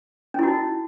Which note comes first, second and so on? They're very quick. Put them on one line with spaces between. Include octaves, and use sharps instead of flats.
C#4 E4 F#4 D#4